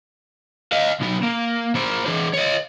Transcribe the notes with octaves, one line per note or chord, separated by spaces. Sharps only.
D#5 F5
B1 B3
A#3
A#3 C5
E3 D4
C#5 D#5